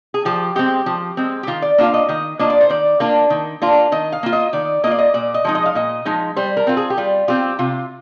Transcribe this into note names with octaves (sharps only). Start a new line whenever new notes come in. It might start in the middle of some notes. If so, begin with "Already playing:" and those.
G#4
F3 G4
G#3 C4 G4
F3
G#3 C4
G4
D#3 F4
D5
A#3 D4 F4 F5
D#5
D#3 D#5
A#3 D4 F4 D#5
D5
C5
D#3 D5
A#3 D4 F4
D#3
A#3 D4 F4
D#3 D#5
F5
A#3 F4
D#5
D#3 D5
A#3 F4 D5 D#5
D#5
A#2 D5
D#5
F3 G#3 D#4
D#5
F5
A#2 D#5
F3 G#3 D#4
G3 C5
A#4
C4 F4
G#4
G4
G3 F4
C4 F4 G4
C3 F4